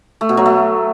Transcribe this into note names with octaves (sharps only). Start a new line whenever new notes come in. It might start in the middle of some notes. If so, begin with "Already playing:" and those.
A3
B2
F#3
A3